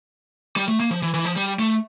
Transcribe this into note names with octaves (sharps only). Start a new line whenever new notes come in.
G3
A3
A#3
F3
E3
E3
F3
G3
A3